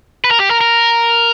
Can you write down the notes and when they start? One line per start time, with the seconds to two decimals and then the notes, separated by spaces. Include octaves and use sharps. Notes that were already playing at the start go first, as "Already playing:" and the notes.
0.25 B4
0.31 A#4
0.40 G4
0.50 A#4
0.61 A#4